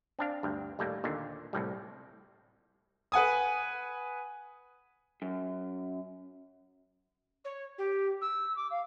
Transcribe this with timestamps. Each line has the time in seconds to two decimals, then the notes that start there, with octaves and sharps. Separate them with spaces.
0.19 C4 D4 F5
0.43 D2 G2
0.79 D#2 A2 G3 A3 A#3
1.04 D#2 A#2 D3
1.53 C2 A2 G3
3.12 B4 F#5 G#5 D#6
5.22 F#2
7.44 C#5
7.78 G4
8.21 E6
8.56 D6
8.70 F5